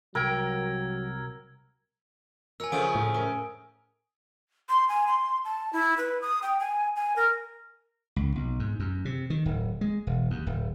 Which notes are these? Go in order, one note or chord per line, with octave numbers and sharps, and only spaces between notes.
C2 F#3 A#4 G5 E6 G#6
A#4 C#5 G#5 E6
C#3 F3 A3 G#5 D#6 D7
A2
C#4 A#4
C6
G#5
C6
A5
E4
B4
D#6
G5
G#5
G#5
A#4
C#2
B1
G#2
F#2
C3
D#3
D1
G#3
E1
D#2
D1